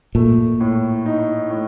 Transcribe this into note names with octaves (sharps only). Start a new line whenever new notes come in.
A#2 A3
A2
D#4
A2